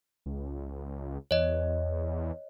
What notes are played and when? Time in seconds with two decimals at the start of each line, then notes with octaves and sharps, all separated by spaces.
0.26 C#2
1.31 E2 C#5 D#5